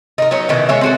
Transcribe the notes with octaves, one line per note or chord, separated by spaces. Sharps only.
D#4 A#4
F#3 B3 C#4 D#4
B2 D#3 E3
G#3 C#5 E5
C4 F#4 A4